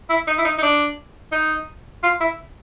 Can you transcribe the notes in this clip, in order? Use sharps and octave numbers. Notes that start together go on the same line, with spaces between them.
E4
D#4
E4
D#4
D#4
D4
D#4
F4
E4